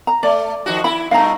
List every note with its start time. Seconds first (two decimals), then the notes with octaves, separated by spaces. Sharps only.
0.07 A#5
0.23 A3 D5
0.66 D#3 F3 F#4
0.84 E4 B5
1.11 G2 B2 A3 F5 A#5